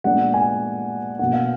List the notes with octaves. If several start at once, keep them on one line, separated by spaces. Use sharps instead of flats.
A#2 G#3 B3 D4 F#5
G#5
B2 A#3 D4 F#5
F5